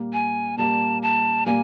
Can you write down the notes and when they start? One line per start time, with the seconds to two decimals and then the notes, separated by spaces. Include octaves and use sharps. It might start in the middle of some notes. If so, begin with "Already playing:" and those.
Already playing: A#2 G3 A#3
0.13 G#5
0.57 A#2 G3 A#3 A5
1.02 A5
1.46 A#2 G3 A#3 G#5